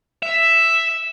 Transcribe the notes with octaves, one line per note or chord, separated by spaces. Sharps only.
E5